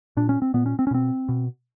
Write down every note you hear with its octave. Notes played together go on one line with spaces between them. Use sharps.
A#2 D4
C#4
C4
A#2 B3
C#4
C4
C#4
B2 C4
B2